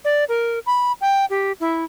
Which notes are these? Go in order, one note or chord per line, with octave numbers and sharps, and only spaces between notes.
D5
A#4
B5
G5
G4
E4